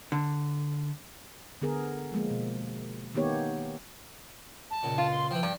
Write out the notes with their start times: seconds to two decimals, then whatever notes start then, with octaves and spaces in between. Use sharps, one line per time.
0.12 D3
1.62 D3 B3 G#4 A#4
2.12 F3 G#3 A#3
2.30 B2
3.15 D#3 A#3 B3 D#4 G4 C#5
4.71 A5
4.83 C#2 A#2
4.98 F4
5.11 C6
5.31 E3 F3 G5
5.43 G2 D4